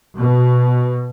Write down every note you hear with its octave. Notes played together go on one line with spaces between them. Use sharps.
B2